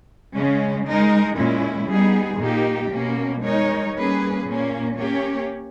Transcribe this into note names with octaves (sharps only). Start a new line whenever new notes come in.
C#3 G#3 C#4
G#3 D#4 A#4
A#2 G#3 C#4 E4
G3 B3 D#4 G#4
A#2 A#3 D#4 G4
B2 A#3 C#4
G#3 D#4 A#4 C#5
G3 A#3 C#4 G#4 B4
A#2 A#3 C#4
A#3 C#4 G4 C#5